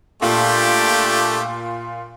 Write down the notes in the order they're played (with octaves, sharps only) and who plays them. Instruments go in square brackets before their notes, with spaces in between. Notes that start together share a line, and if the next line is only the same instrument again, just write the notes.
[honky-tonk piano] A#2 [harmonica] A3 D4 G4